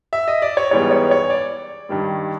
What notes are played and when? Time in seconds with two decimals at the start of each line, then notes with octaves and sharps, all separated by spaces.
0.13 E5
0.28 D#5
0.42 D5
0.57 C#5
0.71 G#2 E3 G3 B3 C#5
0.91 C#5
1.11 C#5
1.30 D5
1.89 G2 D#3 G3